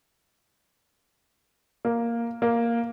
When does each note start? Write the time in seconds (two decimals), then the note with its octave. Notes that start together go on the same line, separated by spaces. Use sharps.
1.85 A#3
2.42 A#3